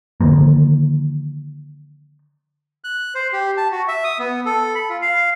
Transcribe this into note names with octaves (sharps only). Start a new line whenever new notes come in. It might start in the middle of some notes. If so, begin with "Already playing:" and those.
D3 D#3 F3 A#3
F#6
C5
G4
A5
F#4
E5
D#6
B3
A4
B5
F4
F5